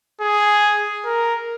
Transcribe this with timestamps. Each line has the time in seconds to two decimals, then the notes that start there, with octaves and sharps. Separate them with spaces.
0.21 G#4
1.05 A#4